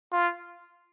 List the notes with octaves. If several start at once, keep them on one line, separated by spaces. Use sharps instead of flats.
F4